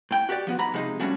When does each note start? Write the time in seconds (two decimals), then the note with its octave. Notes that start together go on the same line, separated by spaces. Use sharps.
0.11 A2 G5
0.29 F#4 G4 A#4 D5
0.47 F3 B3 F#4
0.59 G#2 A#5 B5
0.74 C3 F3 G#3 D#4
1.00 F3 G3 A3 C#4 D4 F#4